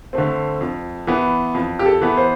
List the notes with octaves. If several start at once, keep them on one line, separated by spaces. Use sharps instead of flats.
D3 A3 C4
F2
E3 B3
F2
G4
A4
E3 B3
C5